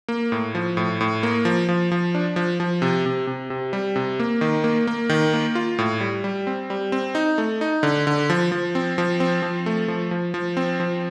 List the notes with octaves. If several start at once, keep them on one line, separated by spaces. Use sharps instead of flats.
A#3
A2
F3
A2
A2
A#3
F3
F3
F3
D4
F3
F3
C3
C3
C3
C3
G3
C3
A#3
D#3
A#3
A#3
D#3
A#3
F4
A2
G3
G3
C4
G3
C4
D#4
A3
D#4
D3
D3
F3
F3
C4
F3
C4
F3
A3
F3
F3
F3
C4
F3